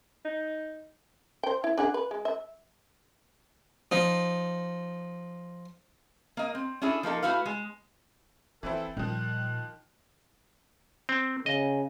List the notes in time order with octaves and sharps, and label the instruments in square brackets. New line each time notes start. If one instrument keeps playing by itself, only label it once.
[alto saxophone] D#4
[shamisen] C5 G5
E4
D4 G#4 F#5
B4
G#3
E5
[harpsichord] F3 D#4
[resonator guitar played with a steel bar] A#3 D#5
C4
C#4 D4 E4 G#4 A4
F3 A#3 D#4 A4
A3 A#3 E4 F#4 B4 F5
G#3
[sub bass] F#1 [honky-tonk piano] E3 C4 E4 [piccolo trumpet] A4
[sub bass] A#2 [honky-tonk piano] D#3 F3 [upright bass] G3 [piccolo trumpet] F#6
[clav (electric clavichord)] C4
[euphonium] C#3 [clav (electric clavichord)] D#5